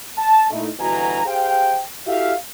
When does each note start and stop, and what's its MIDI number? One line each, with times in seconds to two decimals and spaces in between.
0.18 0.50 81
0.51 0.68 46
0.51 0.68 57
0.51 0.68 63
0.51 0.68 64
0.80 1.23 31
0.80 1.23 47
0.80 1.23 52
0.80 1.23 66
0.80 1.23 80
0.80 1.23 82
1.26 1.81 67
1.26 1.81 68
1.26 1.81 72
1.26 1.81 77
1.26 1.81 79
2.07 2.34 64
2.07 2.34 66
2.07 2.34 67
2.07 2.34 69
2.07 2.34 76
2.07 2.34 77